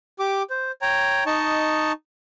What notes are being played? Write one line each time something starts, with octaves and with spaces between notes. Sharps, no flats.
G4 D6
C5
C#5 G5 A#5
D#4 D#5 A5 C#6